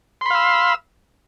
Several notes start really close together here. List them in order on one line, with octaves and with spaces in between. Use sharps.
C6 B5 F5 E6